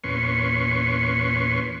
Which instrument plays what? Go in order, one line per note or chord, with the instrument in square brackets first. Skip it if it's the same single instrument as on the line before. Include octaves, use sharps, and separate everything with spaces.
[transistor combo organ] E2 A#2 C#4 B4 C6 C#6